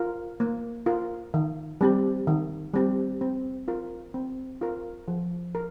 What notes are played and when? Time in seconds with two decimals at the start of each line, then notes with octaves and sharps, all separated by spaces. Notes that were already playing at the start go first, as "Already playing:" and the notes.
Already playing: F4 A#4
0.40 A#3
0.86 F4 A#4
1.34 D#3
1.81 G3 C4 G4
2.27 D#3
2.74 G3 C4 G4
3.21 C4
3.68 F4 A#4
4.14 C4
4.61 F4 A#4
5.08 F3
5.55 A#4